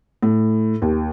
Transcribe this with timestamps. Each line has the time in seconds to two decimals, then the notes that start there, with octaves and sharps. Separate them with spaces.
0.23 A2
0.82 D#2